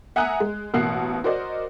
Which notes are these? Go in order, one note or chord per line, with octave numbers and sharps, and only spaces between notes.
E5 F#5 G#5 A#5 D#6 F#6
G#3
A1 B2 A#3 F#5 F#6 C7
F#4 A#4 C5 D5 D#5